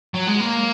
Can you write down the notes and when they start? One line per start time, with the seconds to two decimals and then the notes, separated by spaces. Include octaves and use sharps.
0.14 F#3
0.27 G#3
0.40 A#3